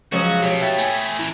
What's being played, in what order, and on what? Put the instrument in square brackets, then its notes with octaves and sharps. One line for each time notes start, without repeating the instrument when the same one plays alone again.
[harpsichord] C#2 F3 F#3 [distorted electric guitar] F#4 [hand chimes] G#4 F5 D#6
[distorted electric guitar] B2 [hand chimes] G4 C#5
[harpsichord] E4 [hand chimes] G5 A6 B6
[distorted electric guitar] A3 G#4 [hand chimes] G#5
[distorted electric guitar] A2 E3 [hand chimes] E4